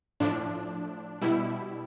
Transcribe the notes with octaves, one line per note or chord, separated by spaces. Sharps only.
A2 F3 D4
B2 G3 E4